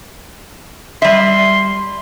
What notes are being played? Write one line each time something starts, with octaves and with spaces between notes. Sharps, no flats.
G3 E5 C6